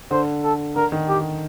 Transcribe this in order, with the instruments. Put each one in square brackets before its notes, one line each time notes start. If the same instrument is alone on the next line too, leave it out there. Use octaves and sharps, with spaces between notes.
[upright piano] D3 [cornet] C5
[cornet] A4
[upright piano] D3 [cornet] A#4
[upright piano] D#3
[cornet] G4